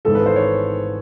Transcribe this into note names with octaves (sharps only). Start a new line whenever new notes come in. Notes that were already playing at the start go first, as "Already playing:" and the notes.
G#1 G#2 E3 G#3 B3 A4
B4
C5
C#5